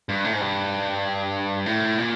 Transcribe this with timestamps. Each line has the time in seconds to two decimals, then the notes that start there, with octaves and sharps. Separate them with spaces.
0.09 G2
0.24 A2
0.33 G#2
0.40 G2
1.66 A2
1.98 A#2